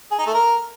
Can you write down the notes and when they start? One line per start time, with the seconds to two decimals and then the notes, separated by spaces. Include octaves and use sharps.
0.11 G#4
0.19 D#4
0.26 A3
0.34 A#4